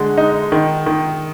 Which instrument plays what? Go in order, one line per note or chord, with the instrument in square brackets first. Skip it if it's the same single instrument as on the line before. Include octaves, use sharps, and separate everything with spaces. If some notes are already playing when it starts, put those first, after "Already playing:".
Already playing: [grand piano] D3 G#3 F#4
D#4
D#3
D#3